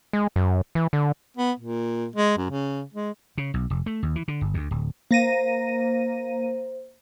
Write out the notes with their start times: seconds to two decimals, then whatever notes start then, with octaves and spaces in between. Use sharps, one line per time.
0.13 G#3
0.36 F#2
0.75 E3
0.93 D3
1.37 B3
1.60 A#2
2.16 G#3
2.37 F#2
2.50 C#3
2.94 G#3
3.38 C#3
3.54 B1
3.70 F1
3.86 A3
4.03 D#2
4.16 E3
4.28 D3
4.41 G1
4.54 D2
4.71 D1
5.11 A#3 C5 A#6 D#7